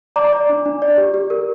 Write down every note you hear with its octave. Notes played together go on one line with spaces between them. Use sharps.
D5 A#5 D6
D5
D4
D4
D5
G4
G4
A#4